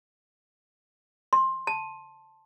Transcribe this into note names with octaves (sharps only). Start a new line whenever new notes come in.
C6
A5